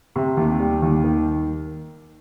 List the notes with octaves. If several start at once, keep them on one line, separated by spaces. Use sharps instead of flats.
C3
D#2
G3
D#2
D#3